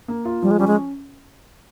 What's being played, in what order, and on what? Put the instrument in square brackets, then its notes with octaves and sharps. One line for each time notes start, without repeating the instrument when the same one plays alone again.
[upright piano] A#3
F4
[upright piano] F3 [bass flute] G3
[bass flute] G#3
[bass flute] G3 [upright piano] C#4
[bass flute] G#3